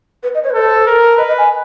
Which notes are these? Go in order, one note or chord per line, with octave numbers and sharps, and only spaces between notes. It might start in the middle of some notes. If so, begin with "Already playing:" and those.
B4
D#5
C#5
B4
A4 C5
A#4
B4 D#5
D#5
G#5